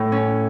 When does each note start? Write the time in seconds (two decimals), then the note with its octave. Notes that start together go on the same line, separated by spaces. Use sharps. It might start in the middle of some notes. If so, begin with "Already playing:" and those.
Already playing: A2 E4 C#5
0.12 C#4